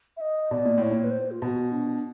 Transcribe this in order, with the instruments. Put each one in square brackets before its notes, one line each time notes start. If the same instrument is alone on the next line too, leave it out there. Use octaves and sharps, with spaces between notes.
[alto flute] E5
D#5
[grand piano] B2 [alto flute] D5
[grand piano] A#2
[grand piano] A2 [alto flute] C#5
[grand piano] A#2
[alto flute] B4
C5
F4
[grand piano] B2 [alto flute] F#4
[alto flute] D4